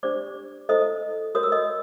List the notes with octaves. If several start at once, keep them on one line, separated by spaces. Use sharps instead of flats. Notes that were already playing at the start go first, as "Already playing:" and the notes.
D4 G4 C5 D5 D6
E4 A4 C5 D#5 D#6
F#4 A#4 C#5 D#6
E6
D#5 D#6